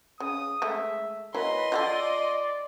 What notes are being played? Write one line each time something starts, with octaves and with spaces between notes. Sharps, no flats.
C#3 D#6
G#3 A3 E5
E3 F#3 A#3 D#5 B5 C6
F4 G4 A4 D5